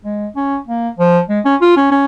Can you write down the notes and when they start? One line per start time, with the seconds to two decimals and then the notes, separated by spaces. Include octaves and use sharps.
0.05 G#3
0.36 C#4
0.67 A#3
0.98 F3
1.29 G#3
1.45 C#4
1.61 F4
1.77 C#4
1.91 C#4